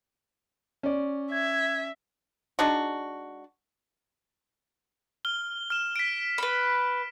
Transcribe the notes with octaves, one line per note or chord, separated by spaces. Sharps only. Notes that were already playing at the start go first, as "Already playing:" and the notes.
C#4 D5
E5 G#6
G#3 D4 D#4 F#4
F6 G7
F6 E7
B6 D7
B4 B5